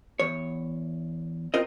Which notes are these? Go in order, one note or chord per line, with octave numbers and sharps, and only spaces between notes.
E2 C#5
C4 F4 A#4 D#5